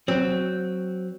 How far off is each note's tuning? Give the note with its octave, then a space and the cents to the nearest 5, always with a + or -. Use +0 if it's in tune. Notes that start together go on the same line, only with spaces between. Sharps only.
F#3 +0 C4 +0